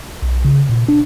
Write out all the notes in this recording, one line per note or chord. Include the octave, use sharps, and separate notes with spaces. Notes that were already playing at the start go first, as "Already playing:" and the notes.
B1
C#3
A#2
D4